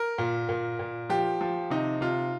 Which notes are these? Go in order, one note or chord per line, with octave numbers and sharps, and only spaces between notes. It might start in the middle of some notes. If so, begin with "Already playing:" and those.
Already playing: A#4
A#2
A#2
A#2
F3 G4
F3
C3 D#4
C3 F4